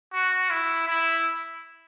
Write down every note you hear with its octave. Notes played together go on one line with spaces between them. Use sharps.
F#4
E4
E4